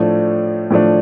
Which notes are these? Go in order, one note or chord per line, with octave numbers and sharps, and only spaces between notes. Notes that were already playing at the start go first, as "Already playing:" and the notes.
Already playing: A2 F3 A3 D4
A2 F3 A3 D4